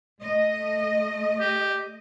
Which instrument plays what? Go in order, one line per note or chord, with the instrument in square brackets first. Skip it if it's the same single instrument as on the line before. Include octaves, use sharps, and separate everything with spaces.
[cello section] A3 D#5
[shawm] G4